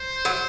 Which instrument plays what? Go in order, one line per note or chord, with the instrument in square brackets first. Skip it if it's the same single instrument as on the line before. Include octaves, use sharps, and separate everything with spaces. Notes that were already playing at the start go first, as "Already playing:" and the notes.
Already playing: [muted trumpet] C5
[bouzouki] F#3